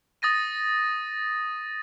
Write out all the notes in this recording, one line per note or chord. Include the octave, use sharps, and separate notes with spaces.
D#6 A6 A#6 D#7